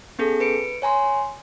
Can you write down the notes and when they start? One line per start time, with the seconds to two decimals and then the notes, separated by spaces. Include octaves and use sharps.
0.19 B3 C#4 G#4 A4
0.40 B4 C#7 D7
0.82 C#5 G#5 A#5 C6